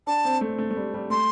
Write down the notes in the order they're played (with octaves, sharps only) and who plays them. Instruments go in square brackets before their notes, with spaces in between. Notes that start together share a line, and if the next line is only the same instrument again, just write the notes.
[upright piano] D4 [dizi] A5
[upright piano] C4
A3
A3
A3
G3
G3
[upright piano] A3 [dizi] C6